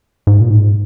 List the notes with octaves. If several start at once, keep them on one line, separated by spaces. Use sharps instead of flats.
G#2
A#2
G#2